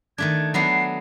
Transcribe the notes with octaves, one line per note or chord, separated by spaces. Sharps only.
D#3 A3 D4 G#6
F#3 B3 D4 C7